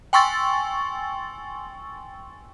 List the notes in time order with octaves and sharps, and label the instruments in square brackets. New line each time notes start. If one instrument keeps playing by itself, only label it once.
[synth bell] G5 G#5 C6 C#6 E6 A6